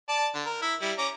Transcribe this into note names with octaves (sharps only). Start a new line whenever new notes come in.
D5 A5
D3
A#4
E4 E5
G3 E4
C#4 A#5 D6